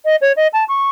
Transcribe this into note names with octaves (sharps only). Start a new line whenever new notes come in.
D#5
C#5
D#5
A5
C#6